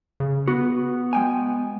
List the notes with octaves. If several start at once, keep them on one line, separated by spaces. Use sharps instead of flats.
C#3
B3 F#4
G#3 G5 G#5